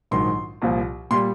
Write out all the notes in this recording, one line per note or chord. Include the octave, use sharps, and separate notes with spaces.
A#1 G#2 D#3 F#3 C6
C2 A#2 F3
A#2 G3 C6